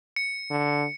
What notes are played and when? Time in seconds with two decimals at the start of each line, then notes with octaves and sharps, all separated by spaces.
0.16 C#7
0.50 D3